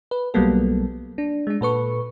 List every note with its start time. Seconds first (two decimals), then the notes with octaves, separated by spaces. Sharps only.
0.11 B4
0.34 B1 F#3 G3 A#3 B3 A4
1.18 D4
1.47 G#3 D4
1.61 A#2 A4 B4 C#6